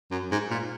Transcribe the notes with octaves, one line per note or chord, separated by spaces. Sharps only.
F#2
G#2
A#2